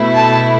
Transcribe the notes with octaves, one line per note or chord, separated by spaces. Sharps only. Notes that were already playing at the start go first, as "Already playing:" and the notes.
Already playing: B2 A3 E4
A5